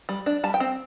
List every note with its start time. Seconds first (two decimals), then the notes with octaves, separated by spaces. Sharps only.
0.09 G3
0.26 D4
0.44 G3 A5
0.54 G5
0.60 C4